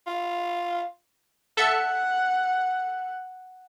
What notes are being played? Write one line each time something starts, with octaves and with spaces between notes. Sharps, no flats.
F4
A4 E5 F#5 C#7